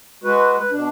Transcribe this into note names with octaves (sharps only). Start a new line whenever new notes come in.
G#3 F#4 B4
B4
B2 D4